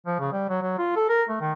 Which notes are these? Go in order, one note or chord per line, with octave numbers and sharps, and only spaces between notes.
F3
C#3
G3
F#3
F#3
F4
A4
A#4
A3
D#3